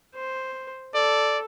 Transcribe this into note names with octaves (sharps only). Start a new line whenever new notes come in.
C5
A4 D5